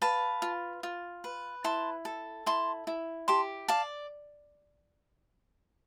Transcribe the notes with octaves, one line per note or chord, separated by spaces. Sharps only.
B4 F5 A5
F4
F4
B4
E4 A5 C6
A4
E4 A5 C6
E4
G4 A5 C6
D5 F5 A5